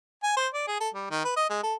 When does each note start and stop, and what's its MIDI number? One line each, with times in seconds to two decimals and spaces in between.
0.23 0.35 80
0.37 0.47 72
0.54 0.65 74
0.68 0.80 68
0.80 0.89 69
0.94 1.08 55
1.11 1.23 51
1.25 1.34 71
1.36 1.46 75
1.50 1.63 56
1.63 1.74 69